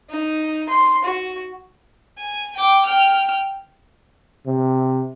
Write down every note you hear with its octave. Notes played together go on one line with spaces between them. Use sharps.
D#4
C6
F#4
G#5
G5 D6
G5 F6
C3